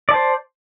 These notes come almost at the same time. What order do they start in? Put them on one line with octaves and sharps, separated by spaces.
D5 A5 C5